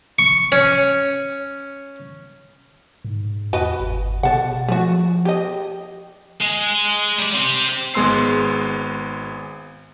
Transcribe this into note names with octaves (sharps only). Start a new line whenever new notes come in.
C#6
C#4
G#2
E2 F#4 B4 D#5
G1
B2 A4 F#5
F3 A3 F#4
G4 D#5
G#3
G3 D5
C4 G4
G#1 G#3 B3 C6 E6 C7